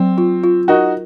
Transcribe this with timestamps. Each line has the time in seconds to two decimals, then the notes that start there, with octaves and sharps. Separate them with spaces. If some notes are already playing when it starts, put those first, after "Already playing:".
Already playing: F#3 C4
0.18 F4
0.43 F4
0.68 D#4 F#4 A#4